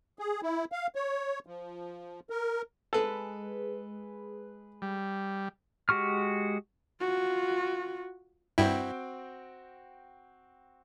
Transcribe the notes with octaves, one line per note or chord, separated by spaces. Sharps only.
G#4
E4
F5
C#5
F3
A#4
G#3 G#4 A4 B4
G3
G#3 F#4 G4 C#6 F6
F4 F#4
G2 C4 E4 F#4 G5